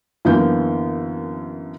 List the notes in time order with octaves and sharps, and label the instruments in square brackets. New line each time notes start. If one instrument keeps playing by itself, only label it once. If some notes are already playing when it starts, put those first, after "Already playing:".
[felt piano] F#2 D3 E3 A#3 B3 G6